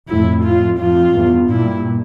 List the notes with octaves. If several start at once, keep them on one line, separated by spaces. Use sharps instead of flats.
F2 A2 E4
F4
F2 F4
E2 G2
G2 A#2 E4